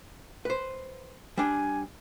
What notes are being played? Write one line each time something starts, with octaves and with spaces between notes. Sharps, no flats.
B4 C5
G3 D4 G#5